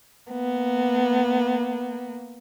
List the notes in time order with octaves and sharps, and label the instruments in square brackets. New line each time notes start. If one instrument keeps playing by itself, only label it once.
[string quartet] A#3 B3